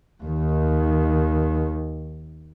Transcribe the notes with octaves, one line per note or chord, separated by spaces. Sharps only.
D#2 D#3